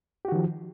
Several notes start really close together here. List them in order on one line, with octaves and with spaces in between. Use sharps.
G4 F#4 D#3 F3